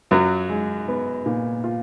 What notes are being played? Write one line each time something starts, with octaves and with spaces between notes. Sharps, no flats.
F#2 F#3 F4
G#3
B3
A#2
F4